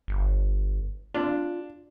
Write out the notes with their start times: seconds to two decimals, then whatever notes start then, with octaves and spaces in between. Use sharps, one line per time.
0.08 G1
1.14 D4 F4